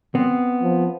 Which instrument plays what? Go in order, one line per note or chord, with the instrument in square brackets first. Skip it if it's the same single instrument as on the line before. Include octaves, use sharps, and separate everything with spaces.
[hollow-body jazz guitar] B3 C4
[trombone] F3